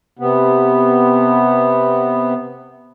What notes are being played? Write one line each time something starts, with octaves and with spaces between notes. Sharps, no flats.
C3 B3